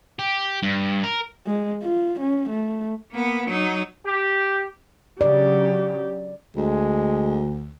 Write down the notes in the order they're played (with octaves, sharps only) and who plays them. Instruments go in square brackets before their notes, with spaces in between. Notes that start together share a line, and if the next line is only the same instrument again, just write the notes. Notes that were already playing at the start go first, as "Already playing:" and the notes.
[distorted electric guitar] G4
G2
A#4
[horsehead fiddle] G#3
F4
C#4
A3
[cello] A#3 B3
F#3 D#4
[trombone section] G4
[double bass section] C#3 F#3 [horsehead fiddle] G4 [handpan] D5
[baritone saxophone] D2 [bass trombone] G#3